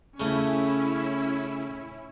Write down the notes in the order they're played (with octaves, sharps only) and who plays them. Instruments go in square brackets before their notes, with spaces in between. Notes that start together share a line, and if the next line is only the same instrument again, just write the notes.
[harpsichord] C#3 A3 [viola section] C#4 E4